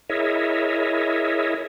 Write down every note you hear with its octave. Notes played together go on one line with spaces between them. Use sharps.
E4 G#4 A#4 C#5 D#5 E5